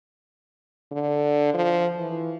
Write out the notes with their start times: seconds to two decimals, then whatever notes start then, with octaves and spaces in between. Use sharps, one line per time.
0.92 D3
1.54 F3
1.98 E3